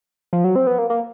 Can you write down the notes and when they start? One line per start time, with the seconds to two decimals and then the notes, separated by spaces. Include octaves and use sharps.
0.33 F3
0.44 F#3
0.56 C4
0.67 B3
0.79 A#3
0.90 A#3